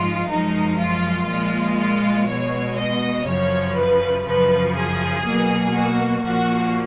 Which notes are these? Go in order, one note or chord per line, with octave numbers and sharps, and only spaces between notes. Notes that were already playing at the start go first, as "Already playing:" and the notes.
Already playing: G#2 F3 G#3 F4
F#2 F3 G#3 D#4
F4
A#2 F3 G#3
F4
B2 G#3 C#5
D#5
F#2 C#3 F3 C#5
B4
F#2 C#3 F3 B4
G#4
B2 F#3 A#3
F#4
A#2 F3 A#3 F#4